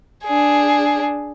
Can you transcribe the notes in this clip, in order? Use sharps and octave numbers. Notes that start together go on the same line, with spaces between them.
D4 G#4